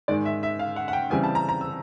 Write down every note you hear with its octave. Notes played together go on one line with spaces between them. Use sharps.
G#2 D#3 G#3 D5
E5
E5
F5
F#5
F#5
G5
C#3 E3 G3 C4 G#5
A5
A#5
A#5
E6